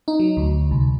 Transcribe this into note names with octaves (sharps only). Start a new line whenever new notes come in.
D#4
F#3
D2
C2